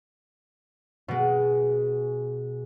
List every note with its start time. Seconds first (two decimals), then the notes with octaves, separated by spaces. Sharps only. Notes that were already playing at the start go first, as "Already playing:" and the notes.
1.08 B2 G#3